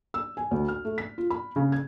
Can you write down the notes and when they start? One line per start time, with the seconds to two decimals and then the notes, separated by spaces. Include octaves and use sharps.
0.14 E6
0.37 G#5
0.51 D2
0.68 F6
0.85 A3
0.98 B6
1.18 F4
1.30 B5
1.56 C#3
1.72 G#6